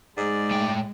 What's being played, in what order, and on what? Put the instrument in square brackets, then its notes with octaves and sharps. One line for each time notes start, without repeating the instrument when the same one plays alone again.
[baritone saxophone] G#2 [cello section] G#3 [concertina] D5
[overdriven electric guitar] A2 G5